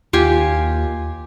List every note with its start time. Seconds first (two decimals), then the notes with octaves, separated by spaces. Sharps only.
0.13 D#2 F4 G4 G#5